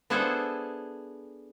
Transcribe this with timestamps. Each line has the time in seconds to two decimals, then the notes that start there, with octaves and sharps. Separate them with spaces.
0.10 B3 D4 E4 G#4 A4 C5